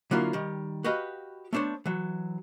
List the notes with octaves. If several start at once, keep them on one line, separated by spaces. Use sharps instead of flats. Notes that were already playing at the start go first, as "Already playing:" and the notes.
D3 F#3 A#3 E4 F4
D#3 G3
F#4 G4 B4 D#5 F5
A3 B3 D4 C5 C#5
E3 F#3